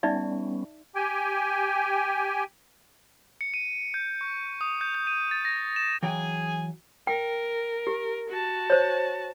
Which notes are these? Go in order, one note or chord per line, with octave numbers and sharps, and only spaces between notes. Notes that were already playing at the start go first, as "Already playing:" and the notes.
G3 B3 C#4 D#4 D5 E5
G4 G5 G#5
C#7
D#7
G6
C#6
D#6
G6
G6
D#7
A6
A#6
E7
E3 F#3 G#4 G5 G#5
A#4 G5
G4
F#4 A5
C5 C#5